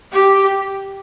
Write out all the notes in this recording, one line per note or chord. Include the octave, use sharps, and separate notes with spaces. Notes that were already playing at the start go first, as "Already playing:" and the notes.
G4